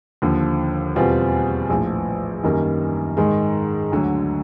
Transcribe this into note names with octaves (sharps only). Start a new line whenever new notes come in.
D#2 D3 F3
E2 B2 G3 C4 F4
A#1 A2 F3
F#2 D#3 G3 A#3
G#2 D#3 G#3
D2 D3 F#3